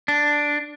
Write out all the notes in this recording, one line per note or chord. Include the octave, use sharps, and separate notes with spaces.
D4